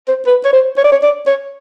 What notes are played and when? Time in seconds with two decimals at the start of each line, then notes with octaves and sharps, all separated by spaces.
0.08 C5
0.27 B4
0.45 C#5
0.53 C5
0.77 C#5
0.84 D5
0.92 C#5
1.03 D5
1.26 C#5